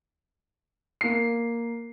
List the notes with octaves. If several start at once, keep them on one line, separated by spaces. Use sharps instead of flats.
A#3 C7